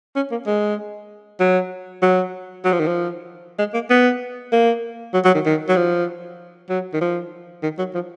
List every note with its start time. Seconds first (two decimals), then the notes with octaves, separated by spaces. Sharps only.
0.16 C#4
0.31 A#3
0.47 G#3
1.40 F#3
2.02 F#3
2.65 F#3
2.72 F3
2.80 D#3
2.87 F3
3.59 G#3
3.74 A#3
3.90 B3
4.52 A#3
5.14 F#3
5.25 F#3
5.35 D#3
5.45 D#3
5.68 F#3
5.76 F3
6.69 F#3
6.93 D#3
7.01 F3
7.63 D#3
7.78 F#3
7.95 F3